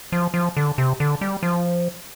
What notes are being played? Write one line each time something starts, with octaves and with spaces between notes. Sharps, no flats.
F3
F3
D3
C3
D3
G3
F3